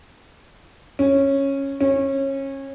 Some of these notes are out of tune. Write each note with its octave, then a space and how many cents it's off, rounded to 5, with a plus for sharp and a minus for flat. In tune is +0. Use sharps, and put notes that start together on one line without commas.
C#4 -10
C#4 -25